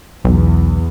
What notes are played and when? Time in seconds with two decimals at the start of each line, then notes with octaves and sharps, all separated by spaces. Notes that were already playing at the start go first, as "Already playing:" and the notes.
0.24 B1 E2